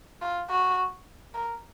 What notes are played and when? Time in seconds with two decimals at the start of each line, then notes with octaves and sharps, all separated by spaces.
0.21 F4
0.50 F#4
1.34 A#4